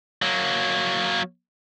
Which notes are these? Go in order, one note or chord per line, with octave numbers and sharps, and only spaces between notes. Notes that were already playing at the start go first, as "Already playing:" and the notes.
F#3 A#3